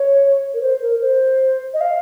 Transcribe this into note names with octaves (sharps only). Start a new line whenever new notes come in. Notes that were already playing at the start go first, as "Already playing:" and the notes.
Already playing: C#5
A#4
C5
A#4
C5
D#5
F5